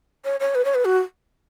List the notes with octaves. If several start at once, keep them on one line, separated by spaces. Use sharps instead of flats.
C#5
C#5
B4
C#5
B4
F#4